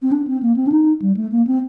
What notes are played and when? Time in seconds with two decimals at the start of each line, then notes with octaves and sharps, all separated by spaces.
0.02 C4
0.12 D4
0.27 C4
0.42 A#3
0.56 C4
0.67 D4
0.72 D#4
1.02 G3
1.17 A3
1.32 A#3
1.47 C4